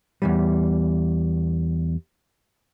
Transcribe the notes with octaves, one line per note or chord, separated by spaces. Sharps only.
E2 G#2 G3